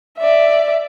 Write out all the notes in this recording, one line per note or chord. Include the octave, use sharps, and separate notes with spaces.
D5 E5